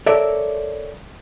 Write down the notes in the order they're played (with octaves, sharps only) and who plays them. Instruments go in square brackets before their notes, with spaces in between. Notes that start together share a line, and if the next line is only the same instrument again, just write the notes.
[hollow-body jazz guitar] A4 A#4 C#5 D5 E5